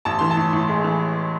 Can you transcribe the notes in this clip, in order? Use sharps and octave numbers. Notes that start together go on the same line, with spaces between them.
A1 A5
E3 C6
A5
A2
A2
G#3
E3